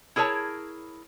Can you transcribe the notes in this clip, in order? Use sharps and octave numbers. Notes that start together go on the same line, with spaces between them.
E4 G#4 A#4 C#5 A5